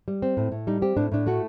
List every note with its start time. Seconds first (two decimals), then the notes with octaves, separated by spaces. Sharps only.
0.08 G3
0.22 C4
0.37 A2
0.52 A2
0.67 G3 D#4
0.82 C4 G4
0.97 A2 D4
1.12 A2 D4
1.26 A3 F#4